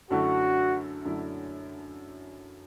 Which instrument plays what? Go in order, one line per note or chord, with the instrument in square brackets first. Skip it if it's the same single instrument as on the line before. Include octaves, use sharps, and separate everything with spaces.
[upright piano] F#2 D3 F#3 A3 E4 [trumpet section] F#4
[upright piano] F#2 D3 F#3 A3 E4